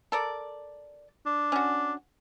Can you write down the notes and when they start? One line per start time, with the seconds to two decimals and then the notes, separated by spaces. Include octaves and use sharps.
0.12 A4 A#4 D5
1.26 D4
1.52 C#4 F#4